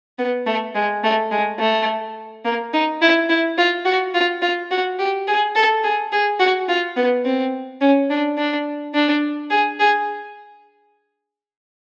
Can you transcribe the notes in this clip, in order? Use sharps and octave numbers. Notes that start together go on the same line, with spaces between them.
B3
A3
G#3
A3
G#3
A3
A#3
D#4
E4
E4
F4
F#4
F4
F4
F#4
G4
G#4
A4
G#4
G#4
F#4
F4
B3
C4
C#4
D4
D4
D4
G#4
G#4